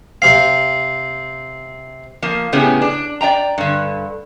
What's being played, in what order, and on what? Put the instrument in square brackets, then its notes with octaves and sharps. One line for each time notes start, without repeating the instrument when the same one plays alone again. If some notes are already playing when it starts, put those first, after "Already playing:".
[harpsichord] C3 C4 F5 [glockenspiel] C7
[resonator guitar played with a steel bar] F3 A#3
A2 C#3 B3 C#4 G4 G#4
D4
D5 E5 G5 A#5
G2 D3